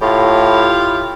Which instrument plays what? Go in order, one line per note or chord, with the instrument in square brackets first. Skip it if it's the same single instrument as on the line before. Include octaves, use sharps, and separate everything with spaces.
[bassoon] A2 [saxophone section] E4 F4 G4